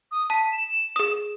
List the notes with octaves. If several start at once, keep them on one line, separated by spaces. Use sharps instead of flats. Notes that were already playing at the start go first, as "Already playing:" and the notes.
D#6
A5 B6
E7
G#4 D#6